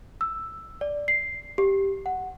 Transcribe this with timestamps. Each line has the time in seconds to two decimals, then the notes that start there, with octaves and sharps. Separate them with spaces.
0.21 E6
0.81 D5
1.08 C7
1.58 G4
2.06 F#5